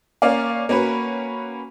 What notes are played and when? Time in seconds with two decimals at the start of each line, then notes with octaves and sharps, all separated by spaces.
0.22 A#3 C#4 D5 F5
0.69 A#3 C#4 F#4 B4